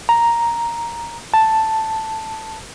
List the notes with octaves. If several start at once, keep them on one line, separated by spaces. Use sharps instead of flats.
A#5
A5